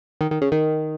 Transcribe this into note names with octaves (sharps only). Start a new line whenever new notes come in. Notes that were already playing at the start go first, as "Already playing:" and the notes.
D#3
D#3
C#3
D#3